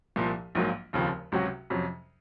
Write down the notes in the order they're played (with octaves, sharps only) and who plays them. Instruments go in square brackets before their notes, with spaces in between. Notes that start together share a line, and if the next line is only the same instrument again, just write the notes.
[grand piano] C2 A#2 F3
A#1 G#2 F#3 A#3
F1 D#2 C#3 F3 C4
C#2 C3 F#3 C#4 F#4
F2 C3 F#3 C#4